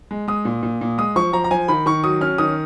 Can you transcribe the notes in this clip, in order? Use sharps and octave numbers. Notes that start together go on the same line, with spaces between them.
G#3
G#3 D#6
A#2
A#2
A#2
G#3 D#6
F3 C#6
F3 A#5
A#5
F3 G#5
D#3 B5
D#3 C#6
F#3 D#6
C#4 F6
D#3 D#6